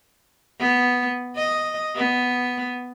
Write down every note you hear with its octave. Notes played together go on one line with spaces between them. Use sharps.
B3
D#5
B3